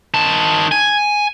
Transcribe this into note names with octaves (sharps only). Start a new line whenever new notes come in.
D#3 A5
G#5